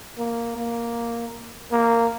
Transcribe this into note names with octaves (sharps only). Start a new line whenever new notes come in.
A#3
A#3
A#3